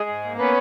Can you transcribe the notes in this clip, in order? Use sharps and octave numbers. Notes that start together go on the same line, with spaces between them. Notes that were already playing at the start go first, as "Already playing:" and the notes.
Already playing: G#3 G#4
G#2
A#3
B3 C#4 B4